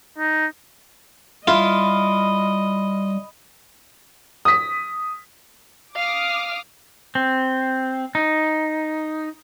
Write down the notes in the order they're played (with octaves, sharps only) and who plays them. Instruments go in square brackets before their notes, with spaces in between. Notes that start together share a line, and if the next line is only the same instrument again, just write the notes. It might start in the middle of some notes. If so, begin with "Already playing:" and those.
[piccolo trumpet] D#4
[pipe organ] G3 [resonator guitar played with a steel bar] E4 [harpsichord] F4 [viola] D#5
[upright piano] D#6 B6
[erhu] F5 [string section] D6 D#6 F6
[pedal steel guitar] C4
D#4